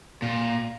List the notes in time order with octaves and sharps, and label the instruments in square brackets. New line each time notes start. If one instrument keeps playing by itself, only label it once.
[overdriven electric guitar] A#2